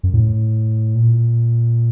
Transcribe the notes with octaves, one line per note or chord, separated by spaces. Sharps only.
F#2
A2
A#2